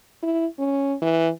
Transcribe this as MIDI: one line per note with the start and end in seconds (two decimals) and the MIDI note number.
0.23 0.46 64
0.59 0.95 61
1.02 1.29 52